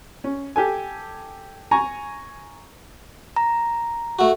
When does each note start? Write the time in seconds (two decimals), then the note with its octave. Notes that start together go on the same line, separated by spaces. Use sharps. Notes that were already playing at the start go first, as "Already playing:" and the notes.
0.24 C#4
0.56 G4 A4 G#5
1.71 G#5 A#5 C#6
3.36 A#5
4.19 A3 F#4